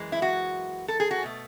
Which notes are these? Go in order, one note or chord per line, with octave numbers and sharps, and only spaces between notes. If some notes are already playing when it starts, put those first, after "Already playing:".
Already playing: F#2 E3 G#3
E4
F#4
A4
G#4
F#4
B2 A3